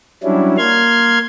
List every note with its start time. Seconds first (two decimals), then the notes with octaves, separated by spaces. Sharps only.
0.24 F#3 G3 C#4 D4 E4
0.58 A#3 C6 F6 G#6